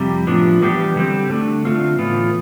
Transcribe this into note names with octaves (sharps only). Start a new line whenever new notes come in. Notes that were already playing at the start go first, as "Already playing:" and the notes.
Already playing: F2 C3 G3
A2 F3 B3 D4
E3 G3 B3 D4 G4
D3 G3 C4 G4
D3 A3 D4
D3 A3 C4 F4
A2 E3 B3 F4